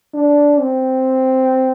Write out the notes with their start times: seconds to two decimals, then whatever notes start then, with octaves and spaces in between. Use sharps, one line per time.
0.14 D4
0.60 C4